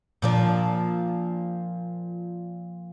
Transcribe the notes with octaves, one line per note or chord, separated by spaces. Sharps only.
A#2 F3 D4